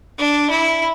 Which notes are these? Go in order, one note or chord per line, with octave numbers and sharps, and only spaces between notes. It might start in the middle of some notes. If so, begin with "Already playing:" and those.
D4
E4